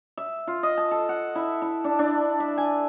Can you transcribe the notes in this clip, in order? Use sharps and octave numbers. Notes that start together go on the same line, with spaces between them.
E5
F4
D#5
A5
A4
F#5
E4
E4
D4
D4
E5
G#5